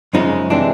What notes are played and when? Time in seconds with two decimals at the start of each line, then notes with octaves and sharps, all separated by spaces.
0.13 F#2 C#3 F3 G#3 D#4
0.50 C3 E3 G#3 D4